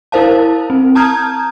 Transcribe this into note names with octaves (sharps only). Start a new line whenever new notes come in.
E4 A#4 C5 F5 A5
C4
A5 A#5 D#6 F6 G6 G#6